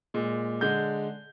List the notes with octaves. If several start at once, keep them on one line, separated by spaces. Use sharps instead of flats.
A#2 G#3
D3 G#3 G6